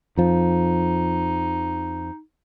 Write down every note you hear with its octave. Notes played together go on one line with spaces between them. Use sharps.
F2 F3 D#4